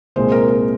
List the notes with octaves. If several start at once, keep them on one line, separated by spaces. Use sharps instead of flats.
C2 A#2 G#3 C5
A#4
A#4